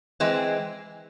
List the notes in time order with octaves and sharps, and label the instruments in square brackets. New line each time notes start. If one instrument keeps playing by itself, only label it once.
[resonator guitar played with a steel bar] E3 G#3 C4